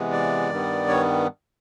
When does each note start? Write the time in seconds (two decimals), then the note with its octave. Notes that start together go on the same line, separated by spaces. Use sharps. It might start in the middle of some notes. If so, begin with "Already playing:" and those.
Already playing: C3 E3 G#3 B3
0.12 D5
0.50 G2 D#3 G3 B3
0.88 C#5